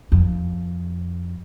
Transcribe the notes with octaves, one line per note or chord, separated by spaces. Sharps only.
F2